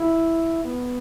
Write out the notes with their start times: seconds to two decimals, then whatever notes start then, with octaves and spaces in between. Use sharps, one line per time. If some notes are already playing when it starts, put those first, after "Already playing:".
Already playing: E4
0.64 B3